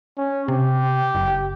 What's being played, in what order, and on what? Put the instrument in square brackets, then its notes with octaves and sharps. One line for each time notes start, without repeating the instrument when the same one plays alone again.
[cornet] C#4
[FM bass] C3 [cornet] G4
[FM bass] F#1